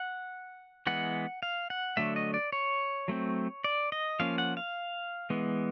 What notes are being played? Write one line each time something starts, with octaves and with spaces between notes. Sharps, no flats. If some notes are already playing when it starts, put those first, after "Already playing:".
Already playing: F#5
E3 G#3 B3 F#5
F5
F#5
D3 F#3 A3 E5
D#5
D5
C#5
F#3 A3 C4
D5
D#5
F3 A#3 C#4 F5
F#5
F5
E3 G#3 B3